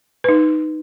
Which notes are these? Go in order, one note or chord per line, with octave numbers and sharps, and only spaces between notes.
D#4 B4